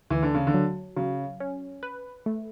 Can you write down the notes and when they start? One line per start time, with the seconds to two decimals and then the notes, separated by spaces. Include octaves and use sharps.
0.10 D2 E3
0.23 D3
0.34 C#3
0.47 D3
0.54 F#3
0.96 C#3 F#3
1.40 C#4
1.83 B4
2.26 A3